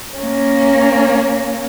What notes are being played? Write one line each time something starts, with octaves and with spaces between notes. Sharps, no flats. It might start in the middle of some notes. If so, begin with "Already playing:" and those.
A#3 C#4